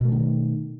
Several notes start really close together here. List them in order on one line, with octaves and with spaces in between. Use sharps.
B2 A3 E3 D#3